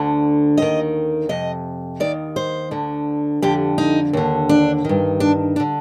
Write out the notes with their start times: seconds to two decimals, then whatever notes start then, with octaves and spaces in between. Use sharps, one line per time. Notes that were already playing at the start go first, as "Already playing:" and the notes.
Already playing: D2 D3
0.58 D#2 D#3 D#5
1.29 F2 C3 D#5
2.00 D#2 D#3 D5
2.36 C5
2.71 D2 D3
3.42 F2 D3 G4
3.78 D#4
4.13 D#2 D3
4.49 D4
4.85 G2 D#3
5.20 D4
5.56 D4
5.60 D3